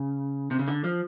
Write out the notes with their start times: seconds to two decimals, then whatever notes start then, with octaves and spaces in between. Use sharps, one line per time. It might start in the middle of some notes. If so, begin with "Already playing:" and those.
Already playing: C#3
0.51 C3
0.59 C#3
0.68 D3
0.84 F3